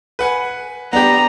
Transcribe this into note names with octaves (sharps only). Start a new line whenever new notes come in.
B4 F#5 G#5
B3 D4 G4 A#5